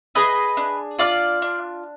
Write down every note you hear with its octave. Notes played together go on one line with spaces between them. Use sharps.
G#4 B4 D#5
D4
F4 D5 F5
D4